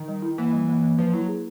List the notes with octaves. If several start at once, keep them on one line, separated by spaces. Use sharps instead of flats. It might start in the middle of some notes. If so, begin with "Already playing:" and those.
Already playing: D#3
G3
E4
E3 A#3
G3
A#3
A#3
F3 B4
F#3 E4
G#4